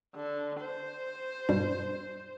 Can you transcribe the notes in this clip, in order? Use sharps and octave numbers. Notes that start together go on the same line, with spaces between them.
D3
C5
G2 B2 G3